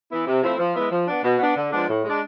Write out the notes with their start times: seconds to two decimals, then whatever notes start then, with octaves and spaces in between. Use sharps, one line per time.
0.09 E3 B3 E4
0.26 C3
0.42 F3 A3 C4 E4
0.58 F3
0.74 G#3 B3 E4
0.91 F3
1.06 B3 D4
1.23 B2
1.39 B3 D4
1.55 D3
1.71 F3 G#3 B3 D4
1.88 A2
2.04 G#3 D4